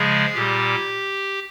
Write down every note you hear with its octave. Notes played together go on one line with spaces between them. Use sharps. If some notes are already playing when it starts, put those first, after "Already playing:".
Already playing: C#3 F3 G#3 G#4
A#2 G3 G4